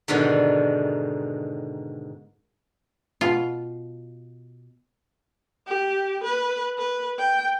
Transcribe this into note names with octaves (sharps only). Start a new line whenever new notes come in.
G#2 B2 D3 D#3
B2 F4
G4
B4
B4
G5